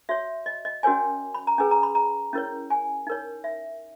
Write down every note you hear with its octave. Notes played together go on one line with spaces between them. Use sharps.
F#4 C#5 E5
D#5
D#5
C#4 F#4 A#4 C#5 G#5
B5
A#5
C#4 G#4 B4 G#5
A#5
B5
A#5
C#4 E4 A#4 C#5
G#5
D#4 A#4 C#5
E5